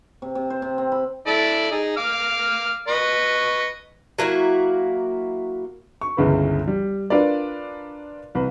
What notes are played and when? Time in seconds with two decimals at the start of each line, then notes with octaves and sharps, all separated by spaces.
0.22 C3
0.35 C3
0.50 C5
0.62 C3
0.78 C4
0.92 B5
1.27 E4 A4 D5
1.71 D#4 G#4
1.97 F5 D6 F6
2.88 B4 D#5 C#6
4.18 F#3 A#3 E4 F#4
6.01 C#6
6.17 G1 C#2 C#3 E4 B4
6.68 G3
7.10 D4 F4 A#4 B4 D5
8.35 C2 B4